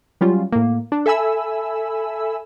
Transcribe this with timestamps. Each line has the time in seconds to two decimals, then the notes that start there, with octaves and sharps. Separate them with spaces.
0.21 F#3 G3 C#4 F4
0.52 A2 A#3
0.92 D4
1.06 A4 E5 G#5 B5 E6